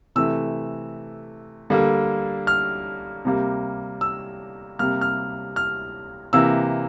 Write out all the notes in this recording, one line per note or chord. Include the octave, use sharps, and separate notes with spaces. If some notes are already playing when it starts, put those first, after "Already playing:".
C3 E3 A3 E6
D3 G3 A#3
F6
C3 G3 A#3
E6
C3 G3 A#3 F6
F6
F6
C3 E3 A#3 E6